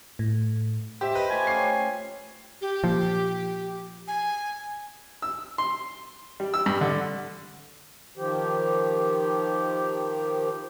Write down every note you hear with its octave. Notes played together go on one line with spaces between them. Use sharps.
A2
G4 C5 E5
B4 D#5
A3 F4 G#5
C#4 G4 C7
G4
A#2 F3
G#5
E6
C6
G3
E6
G2
D3
D#3 F3 G4